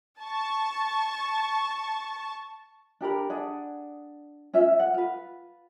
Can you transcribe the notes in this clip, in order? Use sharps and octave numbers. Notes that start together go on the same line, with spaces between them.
A5 C#6
D4 G4 A#4 B5
D4 G#4 D5 F#5
C#4 F4 E5
F#5
F4 B4